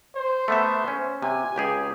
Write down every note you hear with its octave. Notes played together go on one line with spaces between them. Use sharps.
C5
A3 B3 E5
C#4
C3 G#5
C#2 G4 G#4